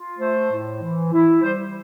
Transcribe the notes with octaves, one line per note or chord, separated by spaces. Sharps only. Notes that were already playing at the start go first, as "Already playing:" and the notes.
Already playing: F4
A3 C5
A2
E3
E4
G3 C5